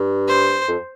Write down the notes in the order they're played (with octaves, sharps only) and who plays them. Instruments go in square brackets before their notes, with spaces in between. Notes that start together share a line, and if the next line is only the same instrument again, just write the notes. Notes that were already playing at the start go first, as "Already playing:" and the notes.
Already playing: [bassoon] G2
[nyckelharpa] C5
[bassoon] F2